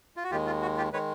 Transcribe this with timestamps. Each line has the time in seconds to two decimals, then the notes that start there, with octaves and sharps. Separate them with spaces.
0.16 F4
0.24 F#4
0.31 D#2 D#3 G#3 F4 G4
0.46 F4
0.62 F#4
0.77 F4 G4
0.93 D#3 G#3 B4 C#5